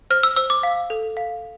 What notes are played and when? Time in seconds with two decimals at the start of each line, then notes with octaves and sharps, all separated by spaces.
0.10 C5 F6
0.23 E6
0.37 C5 E6
0.50 D6
0.63 F5
0.90 A4
1.17 F5